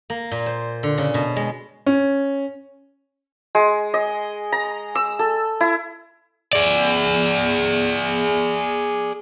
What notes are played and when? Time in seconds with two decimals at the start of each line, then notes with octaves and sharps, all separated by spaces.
0.10 A#3
0.31 A#2
0.46 C5
0.83 D3
0.98 C#3
1.14 B2
1.36 G#3
1.86 C#4
3.55 G#3
3.94 D#5
4.52 A#5
4.95 E6
5.19 A4
5.61 E4
6.53 G#4 D5